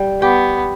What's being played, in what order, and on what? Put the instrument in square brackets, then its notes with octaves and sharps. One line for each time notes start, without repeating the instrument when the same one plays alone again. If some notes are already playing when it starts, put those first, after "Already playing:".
Already playing: [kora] G3
[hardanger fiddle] B3 [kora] G4